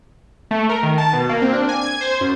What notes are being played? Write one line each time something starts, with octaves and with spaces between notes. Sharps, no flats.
A3
A#4
D#3
A5
B2
A#3
C4
D4
G#5
G#6
C5
F#2